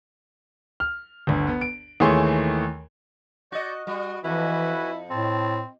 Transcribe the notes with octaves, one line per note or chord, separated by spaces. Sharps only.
F6
G1 D2
B3
D7
D#2 E3 A3 G#4 C#5 C6
F#4 D5 D#5 C#6 G6
G3 F#4
F2 E3 E4 F#4 B4 G#5
A2 C4 A5